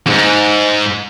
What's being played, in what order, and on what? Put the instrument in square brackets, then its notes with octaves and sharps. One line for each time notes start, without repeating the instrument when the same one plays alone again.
[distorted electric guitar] F2 G#2